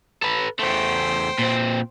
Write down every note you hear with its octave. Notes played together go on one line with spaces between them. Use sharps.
A4 B4
E2 A3 C5 G5
A#2 C4